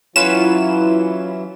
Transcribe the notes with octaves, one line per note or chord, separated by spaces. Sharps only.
E3 F#3 C#4 E4 F4 B4 E7